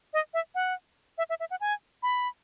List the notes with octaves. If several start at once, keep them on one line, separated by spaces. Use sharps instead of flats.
D#5
E5
F#5
E5
E5
E5
F#5
G#5
B5